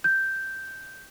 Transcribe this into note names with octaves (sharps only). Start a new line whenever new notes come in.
G6